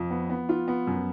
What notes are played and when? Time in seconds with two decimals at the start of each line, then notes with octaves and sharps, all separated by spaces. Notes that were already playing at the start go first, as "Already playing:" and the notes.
Already playing: F2 F3
0.11 B3
0.30 B3
0.49 F4
0.68 B3
0.87 F#2